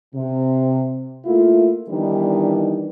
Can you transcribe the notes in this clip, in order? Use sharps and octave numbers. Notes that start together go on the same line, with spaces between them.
C3
A3 A#3 E4 F4
D#3 E3 G3 B3 D4 D#4